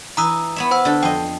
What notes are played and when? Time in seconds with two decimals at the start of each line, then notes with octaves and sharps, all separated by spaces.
0.17 E3 A#5 D#6 E6
0.56 B3 C#5 E5
0.71 C5 F#5 E6
0.85 D3 A4
1.03 F2 D#5 G5